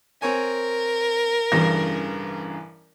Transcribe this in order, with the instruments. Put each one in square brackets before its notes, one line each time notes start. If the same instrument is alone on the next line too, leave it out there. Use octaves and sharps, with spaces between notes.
[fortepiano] C4 C#5 G#5 [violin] A#4
[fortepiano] A1 G2 C#3 [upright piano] E3 A#6